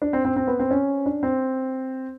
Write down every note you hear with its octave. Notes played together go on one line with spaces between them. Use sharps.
D4
C4
C4
C4
B3
C4
C#4
D4
C4